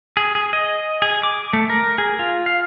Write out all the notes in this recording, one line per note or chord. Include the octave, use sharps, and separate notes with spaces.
G#4
G#4
D#5
G#4
D6
A3
A#4
G#4
F4
F5